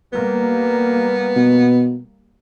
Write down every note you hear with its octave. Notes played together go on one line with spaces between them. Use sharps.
G3 A#3 B3
B2